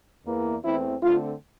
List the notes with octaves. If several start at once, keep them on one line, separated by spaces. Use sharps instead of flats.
E2 E3 A#3
E2 E3 A3 C4 E4
D3 A3 C4 F4